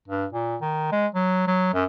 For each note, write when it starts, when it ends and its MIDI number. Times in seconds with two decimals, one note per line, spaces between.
0.08 0.25 43
0.33 0.56 46
0.62 0.88 51
0.92 1.07 56
1.15 1.44 54
1.47 1.74 54
1.74 1.85 42